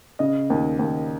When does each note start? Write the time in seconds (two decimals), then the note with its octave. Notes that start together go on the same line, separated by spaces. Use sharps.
0.19 C#3 D#5
0.50 D#2
0.79 D#2